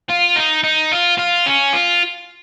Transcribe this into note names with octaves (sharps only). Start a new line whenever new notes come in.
F4
D#4
D#4
F4
F4
C#4
F4